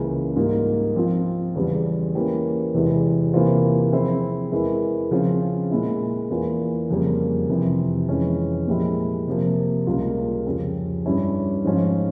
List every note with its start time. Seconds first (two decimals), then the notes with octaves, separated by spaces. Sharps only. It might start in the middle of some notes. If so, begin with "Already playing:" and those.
Already playing: C#2 C#3 E3 A#3
0.36 G#2 G3 A#3 F4
0.96 F3 C4 F4
1.55 E2 C#3 G3
2.15 E3 A#3 C#4 G4
2.74 E2 C3 E3 G#3 C4
3.34 C3 E3 A#3 F4 C5
3.93 F3 C4 E4 G#4 C5
4.52 E2 E3 G#3 E4 A#4
5.11 C#3 F3 C4 F4 C5
5.71 A#2 G#3 E4
6.30 E2 E3 A#3 F4
6.90 F2 C#3 G3 A#3
7.49 F2 C3 E3
8.09 F2 E3 G#3 C#4
8.68 A#2 F3 G#3 E4 G4
9.27 C3 F3 A#3
9.87 C#2 C#3 G3 A#3 F4
10.46 F2 C#3 F3 C4 G4
11.06 G2 G3 C#4 E4
11.64 G#2 F3 G#3 C#4 F4